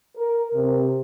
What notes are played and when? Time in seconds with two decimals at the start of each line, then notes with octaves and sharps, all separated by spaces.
0.17 A#4
0.54 C3